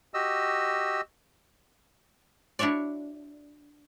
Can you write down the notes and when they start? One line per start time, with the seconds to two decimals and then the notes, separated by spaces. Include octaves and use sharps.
0.14 F#4 G4 D#5 E6
2.59 D4 E4 F#4 C#5 D5